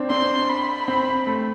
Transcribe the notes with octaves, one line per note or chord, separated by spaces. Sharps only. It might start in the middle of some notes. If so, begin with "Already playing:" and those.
Already playing: C4 D4
C4 C6
B5
C4
A3